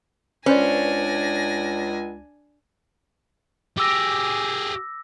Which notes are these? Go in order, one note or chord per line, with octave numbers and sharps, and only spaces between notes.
C#2 C#4 D4 B4 C5 D5 G#5 A#6
G4 G#4 D6 E6 A#6